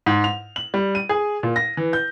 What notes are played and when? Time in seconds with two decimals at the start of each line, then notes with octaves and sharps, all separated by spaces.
0.06 G#2
0.24 F7
0.56 F#7
0.74 G3
0.95 D#7
1.09 G#4
1.43 A#2
1.56 A#6
1.77 E3
1.93 G6